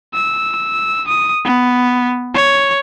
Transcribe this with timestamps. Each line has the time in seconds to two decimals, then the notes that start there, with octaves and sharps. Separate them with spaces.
0.14 E6
1.08 D#6
1.45 B3
2.34 C#5